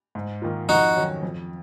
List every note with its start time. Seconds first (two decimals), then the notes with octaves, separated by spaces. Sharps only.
0.15 G#2
0.42 D#3 A#3 F4
0.69 F2 D#4 F#4
0.96 D#3 F#3 C#4
1.23 F2